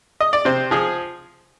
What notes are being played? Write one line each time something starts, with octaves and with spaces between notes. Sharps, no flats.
D#5
D5
C3 C5
F3 G#4